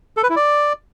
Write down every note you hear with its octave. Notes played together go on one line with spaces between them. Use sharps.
A4
B4
E4
D5